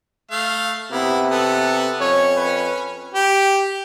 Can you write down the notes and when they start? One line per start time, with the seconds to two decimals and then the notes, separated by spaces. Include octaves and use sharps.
0.31 A3 F5
0.92 C3 B3 E4
1.31 B3 A4
2.01 F2 C#4 C#5
2.37 B4
3.14 G4